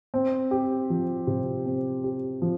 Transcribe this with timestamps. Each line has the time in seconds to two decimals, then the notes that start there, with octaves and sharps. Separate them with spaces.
0.14 C4
0.51 G4
0.90 F3
1.27 C3
1.66 C4
2.04 G4
2.42 F3